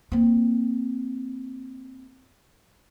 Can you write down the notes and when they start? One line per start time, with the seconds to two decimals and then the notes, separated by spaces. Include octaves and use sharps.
0.12 A#3 C4